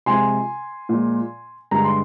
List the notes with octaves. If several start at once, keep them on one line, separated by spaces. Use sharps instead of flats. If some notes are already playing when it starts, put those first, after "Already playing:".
C3 F3 G#3 G#5 C6
A#2 F3 G#3
G2 D3 G#3 A#5
C6